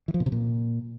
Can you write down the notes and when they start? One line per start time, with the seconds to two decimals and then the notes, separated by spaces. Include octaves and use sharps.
0.08 E3
0.14 F3
0.20 B2
0.26 C3
0.32 A#2